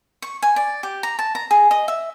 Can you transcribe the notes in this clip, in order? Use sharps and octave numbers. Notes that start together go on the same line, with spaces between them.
C#6
G#5
D5
G4
A#5
A5
A#5
G#4
D#5
E5